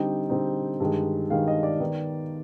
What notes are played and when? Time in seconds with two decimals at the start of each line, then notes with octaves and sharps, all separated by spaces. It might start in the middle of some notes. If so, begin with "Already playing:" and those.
Already playing: D3 G3 C4 D#4 G5
0.30 D3 G3 C4 D#4
0.80 G2 D#3 G#3
1.30 G2 D#3 G#3 F5
1.48 D#5
1.63 D5
1.80 D#3 B3 D#4